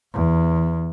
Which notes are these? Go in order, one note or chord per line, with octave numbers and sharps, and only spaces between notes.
E2